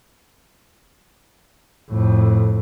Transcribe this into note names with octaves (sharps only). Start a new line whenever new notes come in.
F2 A2